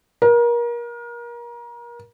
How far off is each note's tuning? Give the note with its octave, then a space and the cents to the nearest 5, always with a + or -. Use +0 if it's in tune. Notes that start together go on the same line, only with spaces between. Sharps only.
A#4 +30